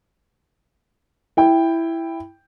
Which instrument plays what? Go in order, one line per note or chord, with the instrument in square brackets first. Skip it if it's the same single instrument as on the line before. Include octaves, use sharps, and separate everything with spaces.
[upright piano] E4 G5